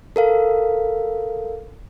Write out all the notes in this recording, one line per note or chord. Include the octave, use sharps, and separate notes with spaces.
A4 A#4 F5